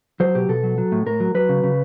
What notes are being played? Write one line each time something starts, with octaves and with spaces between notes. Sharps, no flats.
F#3 C5
B2 G4
B2 A4
F#3
F#3
A2
A2 A#4
F#3
F#3 B4
C#3
C#3